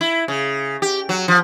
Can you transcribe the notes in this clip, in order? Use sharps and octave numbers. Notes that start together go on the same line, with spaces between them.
E4
C#3
G4
F#3
F3